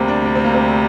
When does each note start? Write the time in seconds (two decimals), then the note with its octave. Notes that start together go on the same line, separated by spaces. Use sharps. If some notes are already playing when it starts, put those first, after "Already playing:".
Already playing: D2 C3 G3 A#3 C4
0.08 D4
0.25 D4
0.35 C4
0.44 A#3
0.55 C4